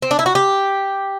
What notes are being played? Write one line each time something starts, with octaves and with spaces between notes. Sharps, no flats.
C4
D4
E4
F#4
G4